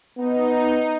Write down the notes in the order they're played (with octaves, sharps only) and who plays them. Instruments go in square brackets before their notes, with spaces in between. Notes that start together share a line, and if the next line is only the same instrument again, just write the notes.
[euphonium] B3 [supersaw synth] D#4